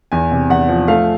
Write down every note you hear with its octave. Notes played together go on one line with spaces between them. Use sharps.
E2 G#5
C3
E2 F#5
F3
A3 F5